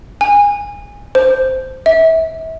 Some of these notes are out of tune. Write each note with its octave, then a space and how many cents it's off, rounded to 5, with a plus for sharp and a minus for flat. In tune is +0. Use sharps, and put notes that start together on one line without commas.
G#5 -25
C5 -5
E5 -30